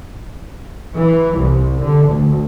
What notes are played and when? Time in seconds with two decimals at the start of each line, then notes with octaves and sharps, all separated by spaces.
0.96 E3
1.40 C2
1.81 D3
2.10 D2